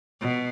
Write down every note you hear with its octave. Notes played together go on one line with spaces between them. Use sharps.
B2